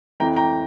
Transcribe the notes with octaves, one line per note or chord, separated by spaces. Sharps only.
F2 E3 G5 A#5
G5 A#5